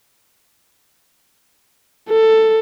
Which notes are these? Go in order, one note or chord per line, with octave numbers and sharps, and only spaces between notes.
A4